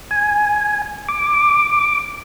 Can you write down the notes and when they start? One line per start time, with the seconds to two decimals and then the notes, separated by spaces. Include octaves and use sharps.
0.11 G#5
1.08 D6